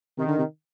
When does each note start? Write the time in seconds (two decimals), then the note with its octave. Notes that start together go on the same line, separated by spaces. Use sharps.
0.18 C3 D#3
0.27 D3
0.38 C3